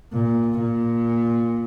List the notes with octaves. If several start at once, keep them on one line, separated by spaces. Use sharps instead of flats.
A#2
A#2